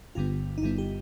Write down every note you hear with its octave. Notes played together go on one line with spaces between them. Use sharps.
G1 G2 D3 G3 B3 F4
D#4
G1 G2 D3 G3 B3 E4
G4